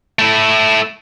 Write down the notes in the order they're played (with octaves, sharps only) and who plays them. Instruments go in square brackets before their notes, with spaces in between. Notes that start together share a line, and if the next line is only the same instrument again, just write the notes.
[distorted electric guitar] A3 E4